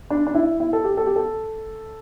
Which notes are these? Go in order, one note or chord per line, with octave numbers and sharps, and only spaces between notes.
D4
D4
E4
E4
A4
G4
A4
G4
A4